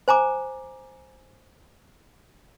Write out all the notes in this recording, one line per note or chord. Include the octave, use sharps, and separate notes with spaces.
C5 G#5 A#5 D6